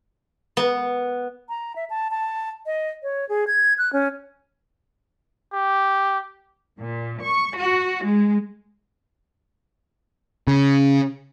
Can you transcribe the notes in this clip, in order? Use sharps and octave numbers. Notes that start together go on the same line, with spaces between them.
B3
A#5
E5
A5
A5
D#5
C#5
G#4
G#6
F#6
C#4
G4
A#2
C#6
F#4
G#3
C#3